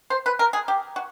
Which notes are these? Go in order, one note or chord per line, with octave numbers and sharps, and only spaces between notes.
C5
B4
A#4
G#4
G4
F#4